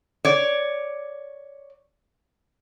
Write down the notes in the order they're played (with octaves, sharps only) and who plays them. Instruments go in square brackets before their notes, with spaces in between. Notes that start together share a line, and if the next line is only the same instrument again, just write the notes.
[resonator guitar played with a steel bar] C#5 D5